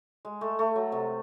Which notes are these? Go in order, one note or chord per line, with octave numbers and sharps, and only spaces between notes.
G#3
A3
A3
F#3
C3